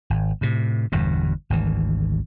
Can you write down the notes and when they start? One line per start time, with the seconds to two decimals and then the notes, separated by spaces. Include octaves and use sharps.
0.10 G#1
0.41 A2 C3
0.92 G1 E2 G2 B2
1.50 G#1 D2 E3